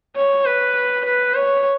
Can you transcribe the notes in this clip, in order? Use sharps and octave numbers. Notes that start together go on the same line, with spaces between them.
C#5
B4
B4
C#5